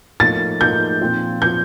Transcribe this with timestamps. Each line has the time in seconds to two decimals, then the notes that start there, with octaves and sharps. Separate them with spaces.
0.20 A2 F3 A#3 D#4 A6
0.61 A2 F3 A#3 D#4 G6
1.01 A#2 F3 C4 F4
1.41 A#2 F3 C4 F4 G6